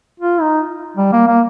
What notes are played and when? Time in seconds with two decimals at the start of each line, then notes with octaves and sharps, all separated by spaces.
0.20 F4
0.41 D#4
0.97 G3
1.12 A#3
1.27 A#3